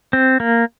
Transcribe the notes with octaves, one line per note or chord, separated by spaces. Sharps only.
C4
A#3